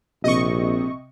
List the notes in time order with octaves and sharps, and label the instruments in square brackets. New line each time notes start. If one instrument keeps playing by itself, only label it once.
[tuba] A#1 [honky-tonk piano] C3 [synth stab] D#5 C#6